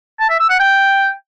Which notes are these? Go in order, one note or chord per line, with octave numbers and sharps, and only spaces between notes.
A5
E5
E6
F#5
G5